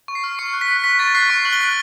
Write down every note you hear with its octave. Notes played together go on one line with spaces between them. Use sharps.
C#6
C7
F6
C#6 C#7
F#6
B6
F#6
C#6 B6
C#6 A6
F#6 C7
C#6 D7
F#6 F#7
G7
F#6